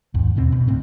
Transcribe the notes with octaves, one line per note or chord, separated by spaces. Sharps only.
D#2 G#2
E2 B2 C4
B2
D2 A2 C4